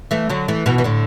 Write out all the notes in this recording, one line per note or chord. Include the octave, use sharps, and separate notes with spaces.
E3 A3
D3 F#3
E3 A3
B2 E3
E3
A2 D3